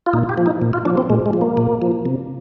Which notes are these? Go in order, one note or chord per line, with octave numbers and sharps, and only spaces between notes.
F4
A#2 D#4
G4
F3
D#4
A#2
F4
F3 D4
C4
A#2 G#3
G#3
F3
A#3
A#2
F3
C3